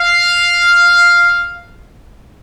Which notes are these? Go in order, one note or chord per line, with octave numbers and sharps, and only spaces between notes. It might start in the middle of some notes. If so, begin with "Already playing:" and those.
Already playing: F5